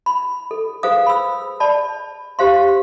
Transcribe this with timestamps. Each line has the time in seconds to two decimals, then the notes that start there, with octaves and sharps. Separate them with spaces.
0.06 B5
0.51 A4
0.83 G#4 B4 C5 F5 D#6
1.07 B5 E6
1.60 D5 A5 B5
2.39 G4 C5 F5 C6